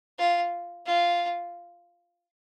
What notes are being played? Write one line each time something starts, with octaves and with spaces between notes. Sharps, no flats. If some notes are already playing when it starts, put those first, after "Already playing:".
F4
F4